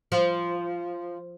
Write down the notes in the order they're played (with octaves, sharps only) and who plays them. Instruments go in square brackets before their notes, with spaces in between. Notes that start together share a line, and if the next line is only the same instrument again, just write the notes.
[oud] F3